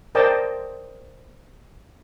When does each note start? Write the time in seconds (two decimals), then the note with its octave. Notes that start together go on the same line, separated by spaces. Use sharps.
0.15 A#4 C5 D5 D#5 G5 A5